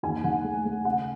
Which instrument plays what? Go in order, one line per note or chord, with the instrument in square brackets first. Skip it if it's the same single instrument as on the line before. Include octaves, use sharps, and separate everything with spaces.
[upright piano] D#2 G#5
D#3 F#5
A3
A3
C#3 F#5